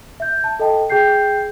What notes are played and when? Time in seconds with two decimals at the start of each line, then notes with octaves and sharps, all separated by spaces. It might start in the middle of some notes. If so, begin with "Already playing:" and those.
0.20 E5 G6
0.44 A5
0.60 A4 D#5 G5 A5
0.90 G#4 G5 G6 C7